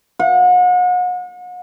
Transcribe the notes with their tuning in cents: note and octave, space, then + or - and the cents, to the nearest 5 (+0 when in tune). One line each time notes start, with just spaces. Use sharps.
F#5 -40